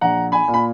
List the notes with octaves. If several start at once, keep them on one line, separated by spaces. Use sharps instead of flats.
A#1 F#5 A#5
G#5 B5
A#2
B5